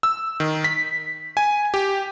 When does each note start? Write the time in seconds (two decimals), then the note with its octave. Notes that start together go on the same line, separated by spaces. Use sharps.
0.03 E6
0.40 D#3
0.64 B6
1.37 G#5
1.74 G4